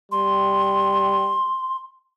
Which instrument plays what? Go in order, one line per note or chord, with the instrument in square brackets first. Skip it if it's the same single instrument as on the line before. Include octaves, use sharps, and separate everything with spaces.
[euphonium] G3 [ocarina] C6